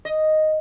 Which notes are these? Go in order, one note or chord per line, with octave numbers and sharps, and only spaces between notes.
D#5